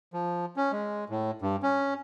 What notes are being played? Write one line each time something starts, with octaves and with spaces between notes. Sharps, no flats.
F3
C#4
G#3
A2
G2
C#4